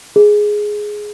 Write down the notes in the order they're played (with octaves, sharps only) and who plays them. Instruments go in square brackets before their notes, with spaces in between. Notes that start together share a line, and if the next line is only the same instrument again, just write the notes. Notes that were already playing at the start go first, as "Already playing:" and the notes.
[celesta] G#4